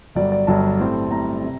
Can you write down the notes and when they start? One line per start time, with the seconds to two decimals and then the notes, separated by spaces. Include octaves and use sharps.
0.15 G1 G2 F#3 D5
0.32 D5
0.47 G1 G2 F#3 A5
0.80 A2 G3 C4
1.10 A2 G3 C4 A#5
1.44 C3